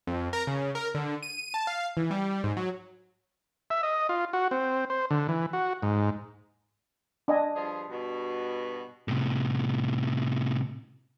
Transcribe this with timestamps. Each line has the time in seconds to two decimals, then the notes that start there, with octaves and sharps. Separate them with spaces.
0.07 F2
0.33 A#4
0.47 C#3
0.75 A#4
0.95 D3
1.23 D#7
1.54 A5
1.67 F5
1.97 E3
2.11 G3
2.44 G#2
2.57 F#3
3.70 E5
3.83 D#5
4.09 F4
4.33 F#4
4.51 C4
4.90 C5
5.11 D3
5.29 E3
5.53 F#4
5.83 G#2
7.28 D4 D#5 G#5
7.56 G2 F3 G#4
7.89 G2 B2
9.08 A2 C3